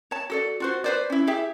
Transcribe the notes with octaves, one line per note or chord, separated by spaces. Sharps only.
C#5 A5
F#4 A4 D5
F4 F#4 C5
B4 C5 D5
C#4 E4
E4 G4 G#4 E5